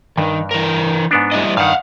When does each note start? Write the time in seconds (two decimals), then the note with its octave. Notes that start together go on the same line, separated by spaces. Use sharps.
0.17 G2 D#3
0.51 E3 A#4
1.11 G#2 B3 D4
1.32 G3 E4 D#5
1.57 G2 D#3 F5 F#5